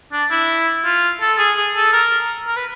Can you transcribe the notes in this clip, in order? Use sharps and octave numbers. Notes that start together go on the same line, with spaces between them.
D4
E4
F4
A4
G#4
G#4
A4
A#4
A#4
B4